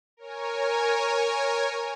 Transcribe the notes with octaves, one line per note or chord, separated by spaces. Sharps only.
A#4 C#5 G#5